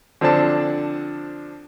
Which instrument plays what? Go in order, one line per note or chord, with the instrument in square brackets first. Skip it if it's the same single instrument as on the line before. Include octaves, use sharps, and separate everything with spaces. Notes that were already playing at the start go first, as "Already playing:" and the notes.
[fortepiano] D3 F3 C4 D4 A5